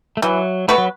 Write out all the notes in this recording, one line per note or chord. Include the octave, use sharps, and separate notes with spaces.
A3
E3 F#3
A3 B3 F#4 B4
F#3